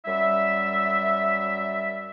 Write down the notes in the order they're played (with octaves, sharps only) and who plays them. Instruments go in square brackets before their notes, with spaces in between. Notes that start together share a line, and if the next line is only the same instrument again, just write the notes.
[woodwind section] F#2 G3 E5